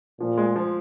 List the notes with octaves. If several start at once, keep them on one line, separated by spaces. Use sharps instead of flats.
A#2 F3
G#3
F3